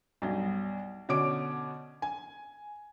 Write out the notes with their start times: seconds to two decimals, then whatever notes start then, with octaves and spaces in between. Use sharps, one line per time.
0.22 B1 G2
1.09 B2 D3 C#4 D6 D7
2.02 G#5